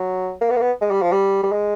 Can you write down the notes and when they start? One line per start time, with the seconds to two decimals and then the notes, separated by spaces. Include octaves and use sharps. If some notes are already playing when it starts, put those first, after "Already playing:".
Already playing: F#3
0.41 A#3
0.50 B3
0.56 A#3
0.61 B3
0.81 G#3
0.91 G3
1.02 F3
1.12 G3
1.43 G3
1.52 G#3